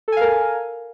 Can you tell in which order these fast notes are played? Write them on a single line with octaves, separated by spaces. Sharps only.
A4 G#5 F5 A#4